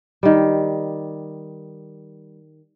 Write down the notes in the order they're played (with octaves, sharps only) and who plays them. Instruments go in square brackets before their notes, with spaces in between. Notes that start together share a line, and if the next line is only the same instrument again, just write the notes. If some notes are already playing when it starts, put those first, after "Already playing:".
[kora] D#3 G3